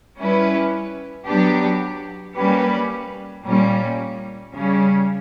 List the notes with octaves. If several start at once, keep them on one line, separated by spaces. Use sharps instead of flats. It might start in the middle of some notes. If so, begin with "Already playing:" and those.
G3 C#4 E4 B4
F#3 B3 D4 G4
G3 A#3 C#4 G4 B4
A#2 G3 A#3 C#4
C#3 G3 C#4